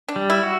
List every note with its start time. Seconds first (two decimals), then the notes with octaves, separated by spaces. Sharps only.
0.09 D4
0.16 G3
0.30 E4
0.43 F#4